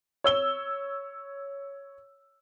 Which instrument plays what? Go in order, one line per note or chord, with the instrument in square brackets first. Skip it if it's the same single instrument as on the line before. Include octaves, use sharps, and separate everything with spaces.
[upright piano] C#5 E6 G7